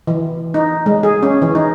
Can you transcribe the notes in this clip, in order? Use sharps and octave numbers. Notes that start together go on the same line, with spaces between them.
E3
D#4
G#3
G#4
C#4
E3
D#4